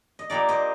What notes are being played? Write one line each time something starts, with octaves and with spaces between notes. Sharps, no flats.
D#5
A#2 G3 A#3 A#4 D5
C5 D#5